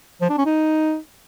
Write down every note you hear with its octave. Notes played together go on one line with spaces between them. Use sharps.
F3
D4
C#4
D#4